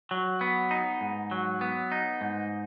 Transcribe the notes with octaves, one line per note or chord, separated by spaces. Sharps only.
F#3
B3
D#4
G#2
F#3
B3
D#4
G#2